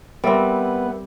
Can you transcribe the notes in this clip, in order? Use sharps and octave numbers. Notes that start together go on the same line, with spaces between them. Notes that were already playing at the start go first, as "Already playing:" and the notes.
G3 B3 C4 A#4 E5 E6